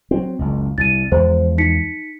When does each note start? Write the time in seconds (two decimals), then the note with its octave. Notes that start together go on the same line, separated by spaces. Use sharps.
0.11 F#3 C4
0.39 F#1 C#2
0.78 C2 A6 D#7
1.12 E2 F3 G#3 C5
1.58 D#4 B6 C#7